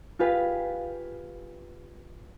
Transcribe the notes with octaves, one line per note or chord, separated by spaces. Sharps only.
F4 G4 G#4 B4 F5